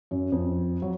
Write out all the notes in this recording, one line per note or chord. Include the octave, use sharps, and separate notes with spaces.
F#2
F2
F#3